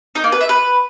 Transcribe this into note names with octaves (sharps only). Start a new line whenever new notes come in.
D#4
A#3
B4
E5
B4